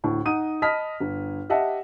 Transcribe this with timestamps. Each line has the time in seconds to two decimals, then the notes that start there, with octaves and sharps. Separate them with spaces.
0.04 D2 A2
0.25 D#4 F#5 D#6 D#7
0.62 D#5 A5 B5 D#6 F6 B6
1.00 G1
1.50 G4 D#5 E5 F#5 A5